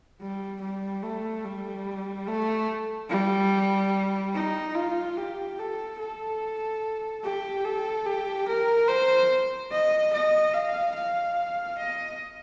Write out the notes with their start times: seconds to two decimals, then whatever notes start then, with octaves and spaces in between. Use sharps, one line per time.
0.21 G3
0.61 G3
1.03 A3
1.45 G3
2.28 A3
3.10 G3
4.34 D#4
4.75 F4
5.17 G4
5.59 A4
6.00 A4
7.24 G4
7.64 A4
8.06 G4
8.48 A#4
8.89 C5
9.71 D#5
10.13 D#5
10.54 F5
10.95 F5
11.78 D#5